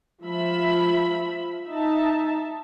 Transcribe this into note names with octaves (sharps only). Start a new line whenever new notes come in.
F3 E5 B5
D#4 E5 A5